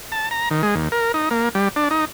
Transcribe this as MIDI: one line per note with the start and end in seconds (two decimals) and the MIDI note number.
0.12 0.29 81
0.31 0.49 82
0.51 0.62 51
0.63 0.75 56
0.75 0.88 39
0.92 1.12 70
1.14 1.29 63
1.31 1.49 58
1.55 1.68 55
1.76 1.89 62
1.91 2.05 63